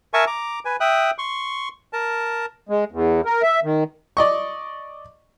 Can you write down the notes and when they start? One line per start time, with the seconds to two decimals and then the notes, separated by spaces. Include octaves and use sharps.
0.14 A#4 E5 G#5 A5 C#6
0.27 A#5 D6
0.65 B4 G#5
0.80 E5 G5 D#6 F#6
1.18 C6 C#6
1.93 A#4 A5
2.69 G#3
2.92 E2
3.25 A#4
3.42 E5
3.64 D#3
4.17 D5 D#5 C#6